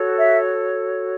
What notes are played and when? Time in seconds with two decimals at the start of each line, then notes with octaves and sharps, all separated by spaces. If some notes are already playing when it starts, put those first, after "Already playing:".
Already playing: F#4 A4 C#5
0.18 E5